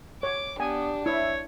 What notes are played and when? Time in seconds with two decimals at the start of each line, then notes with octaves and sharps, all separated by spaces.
0.23 C#5 D6
0.60 B3 D4 G4 G#5
1.06 E4 C#5 E5